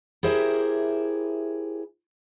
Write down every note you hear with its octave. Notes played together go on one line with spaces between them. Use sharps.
E4 G4 G#4 A#4 C5 E5